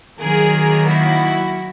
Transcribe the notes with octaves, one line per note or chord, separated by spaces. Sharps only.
D#3 F#3 A#3 G#4 A#4
E4 F#4